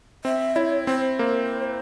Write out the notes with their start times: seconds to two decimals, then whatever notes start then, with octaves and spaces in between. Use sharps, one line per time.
0.24 C4 E5
0.56 E4 C#5
0.87 C4 C5
1.19 A#3